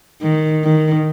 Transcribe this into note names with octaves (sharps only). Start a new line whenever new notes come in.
D#3
D#3